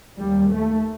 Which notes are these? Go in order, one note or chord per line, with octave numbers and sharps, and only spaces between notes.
D#2 G3
A3